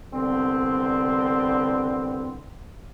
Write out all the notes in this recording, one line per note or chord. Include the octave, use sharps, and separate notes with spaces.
C2 D3 B3 C4